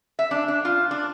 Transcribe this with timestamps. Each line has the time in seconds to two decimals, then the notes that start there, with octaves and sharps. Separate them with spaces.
0.19 E5
0.31 D4
0.48 D4
0.65 F4
0.91 D4